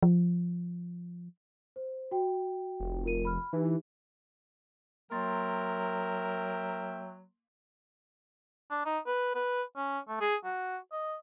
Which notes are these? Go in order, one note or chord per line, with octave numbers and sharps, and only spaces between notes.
F3
C5
F#4 G5
F1
F4 A#4 D#7
B5 F6
E3 D#4 G4
F#3 A#3 A#4 E5 G5 C6 A6
D4
D#4
B4
B4
C#4
A3
G#4
F#4
D#5